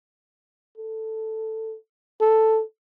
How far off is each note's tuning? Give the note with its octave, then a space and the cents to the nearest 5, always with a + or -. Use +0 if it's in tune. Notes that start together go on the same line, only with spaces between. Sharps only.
A4 +5
A4 +5